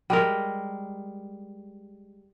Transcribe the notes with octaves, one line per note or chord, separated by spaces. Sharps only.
G3 G#3 A#4